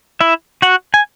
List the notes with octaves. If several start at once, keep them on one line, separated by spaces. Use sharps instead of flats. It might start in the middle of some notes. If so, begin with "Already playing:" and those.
E4 E5
F#4 F#5
G#5